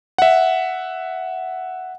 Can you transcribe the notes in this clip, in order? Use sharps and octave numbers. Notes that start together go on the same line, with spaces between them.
E5 F#5